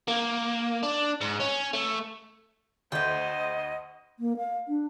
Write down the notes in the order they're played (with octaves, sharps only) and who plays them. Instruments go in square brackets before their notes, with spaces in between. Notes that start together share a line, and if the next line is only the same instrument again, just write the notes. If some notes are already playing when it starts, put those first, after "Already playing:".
[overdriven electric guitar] A#3
D4
G#2
C#4
A3
[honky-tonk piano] D2 [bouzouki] A3 G5 [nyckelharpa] C5 [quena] D#5
[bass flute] A#3
F5
D4